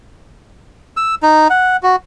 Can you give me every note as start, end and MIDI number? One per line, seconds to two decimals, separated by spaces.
0.97 1.15 88
1.23 1.48 63
1.50 1.77 78
1.83 1.96 66